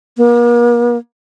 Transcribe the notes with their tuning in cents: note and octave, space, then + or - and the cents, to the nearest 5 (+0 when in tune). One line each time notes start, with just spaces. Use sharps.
A#3 +40